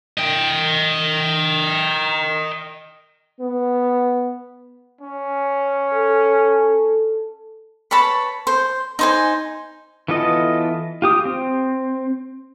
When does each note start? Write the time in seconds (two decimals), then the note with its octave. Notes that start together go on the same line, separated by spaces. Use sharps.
0.18 D#5 G5
3.40 B3
5.01 C#4
5.94 A4
7.91 B4 C#5 A5 B5
8.47 C5
8.99 D#4 C5 G#5
10.08 E3 B3 F4 A4 D#5
11.02 F4 G4 D#6
11.25 C4